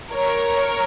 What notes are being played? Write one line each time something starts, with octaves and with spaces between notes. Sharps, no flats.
A#4 C#5